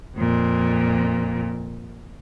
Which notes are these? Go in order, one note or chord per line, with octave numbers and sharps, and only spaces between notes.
F2 A#2